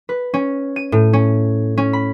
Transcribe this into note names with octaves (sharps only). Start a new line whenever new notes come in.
B4
C#4
D#7
A2
C#4
C#4
B5